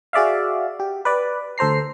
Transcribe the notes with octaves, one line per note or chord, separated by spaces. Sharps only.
F#4 G#4 D5 E5 F5
G4
B4 D5
D2 A4 C5 A#5 C7